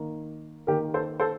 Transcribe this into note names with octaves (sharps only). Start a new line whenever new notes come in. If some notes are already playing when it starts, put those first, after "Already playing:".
Already playing: D#3 A#3
D#3 A#3 G4 A#4
A4 C5
A4 C5